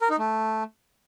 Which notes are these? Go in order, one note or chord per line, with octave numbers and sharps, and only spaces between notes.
A#4
D#4
A3